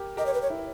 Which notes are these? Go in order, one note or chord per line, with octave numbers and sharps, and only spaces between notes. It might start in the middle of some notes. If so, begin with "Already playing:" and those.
Already playing: G4 A#4
G4 A#4 D#5
C#5
B4
C#5
E4